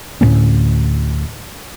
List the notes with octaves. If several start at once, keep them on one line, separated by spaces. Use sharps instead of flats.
D2 A2 A#3 C#4